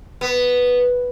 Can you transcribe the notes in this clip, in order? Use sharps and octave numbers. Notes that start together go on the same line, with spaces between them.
B3